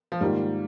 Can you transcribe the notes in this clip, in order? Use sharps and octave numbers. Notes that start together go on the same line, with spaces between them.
F3
G#2 D#3 G3 A#3 F4